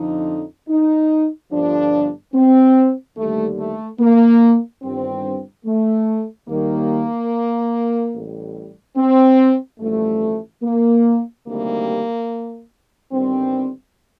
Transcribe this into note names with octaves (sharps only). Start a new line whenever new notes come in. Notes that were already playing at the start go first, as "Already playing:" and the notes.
Already playing: F2 D3 F3 D#4
D#4
G1 G2 F3 D4
C4
D#2 D3 G3 A3
A3
A#3
G1 G2 D#3 C4
A3
D#2 D#3 G3 A#3
A1 A2 G3
C4
A1 G2 D3 F3 A3
A#3
D2 C3 D#3 G3 A#3
G1 G2 D#3 G3 C4